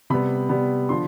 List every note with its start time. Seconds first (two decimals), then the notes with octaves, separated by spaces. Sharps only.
0.10 C3 G3 B3 B5
0.49 C3 G3 B3
0.89 D3 F3 C6